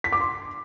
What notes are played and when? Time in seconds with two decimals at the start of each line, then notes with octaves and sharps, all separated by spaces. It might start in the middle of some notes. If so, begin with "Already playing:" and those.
0.04 B6
0.12 D6
0.21 C6